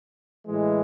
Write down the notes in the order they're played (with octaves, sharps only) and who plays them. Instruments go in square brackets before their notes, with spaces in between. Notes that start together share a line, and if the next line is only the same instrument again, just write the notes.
[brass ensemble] A2 E3 G#3